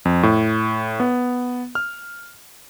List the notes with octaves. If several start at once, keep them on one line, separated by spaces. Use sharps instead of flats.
F2
A2
B3
F6